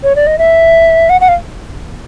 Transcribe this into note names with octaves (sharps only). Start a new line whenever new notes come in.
C#5
D5
D#5
E5
F#5
F#5
F5